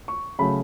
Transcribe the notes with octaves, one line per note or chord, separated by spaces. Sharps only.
C#6
C#3 F#3 A3 B5